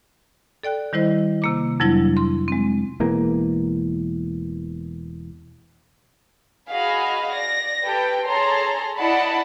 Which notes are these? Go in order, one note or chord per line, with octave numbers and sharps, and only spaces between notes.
A4 D5 G5 F#6
D#3 G3 E4 C5 D#5
C3 A#3 D6
F2 C3 F#3 G3 D4 E4
C6
G#3 C4
E1 E2 A#3
F#4 G#4 D#5 F5 B5
D5 A#6
G4 A4 B4 G5
G#4 A4 C#5 A5 A#5 C6
E4 D5 D#5 F#5 A5 B5